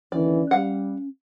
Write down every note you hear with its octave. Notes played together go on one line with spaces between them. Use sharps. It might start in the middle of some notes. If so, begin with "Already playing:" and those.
D#2 D3 E3 C#4 D5
G3 F5 F#5